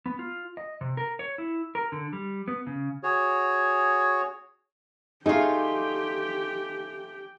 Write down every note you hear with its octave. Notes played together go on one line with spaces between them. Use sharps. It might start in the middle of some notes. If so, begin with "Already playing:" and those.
B3
F4
D#5
C3
A#4
C#5
E4
A#4
D3
G3
B3
C#3
F#4 G#4 C#5
A3 D#4 F4 G4 G#4 G5